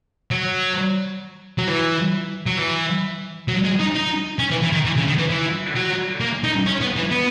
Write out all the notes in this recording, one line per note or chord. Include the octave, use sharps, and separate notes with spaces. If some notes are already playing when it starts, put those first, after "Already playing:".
F#3
F#3
E3
F#3
E3
F#3
G#3
D#4
D#4
C#4
E3
E3
D#3
E3
C#3
D#3
E3
E3
F#3
A#3
D#4
C#4
B3
E3
B3